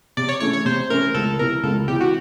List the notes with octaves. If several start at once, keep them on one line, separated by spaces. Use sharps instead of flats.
C3 D5
C#5
E3 A3 C#4 E4 C#5
C#5
C3 C5
E3 A3 C#4 E4 A#4
C#2 A4
C3 E3 A#4
C#2 A4
C3 E3 G4
F#4